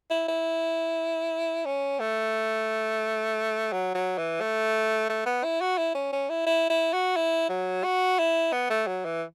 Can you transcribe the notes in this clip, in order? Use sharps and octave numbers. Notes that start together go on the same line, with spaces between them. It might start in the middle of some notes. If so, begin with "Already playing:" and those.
E4
E4
C#4
A3
F#3
F#3
E3
A3
A3
B3
E4
F#4
E4
C#4
C#4
E4
E4
E4
F#4
E4
F#3
F#4
E4
B3
A3
F#3
E3